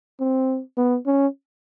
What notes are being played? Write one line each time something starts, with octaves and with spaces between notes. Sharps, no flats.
C4
B3
C#4